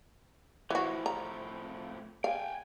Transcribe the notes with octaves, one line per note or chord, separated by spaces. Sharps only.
A2 E3 F3 F#4
A#5
F5 G5 G#5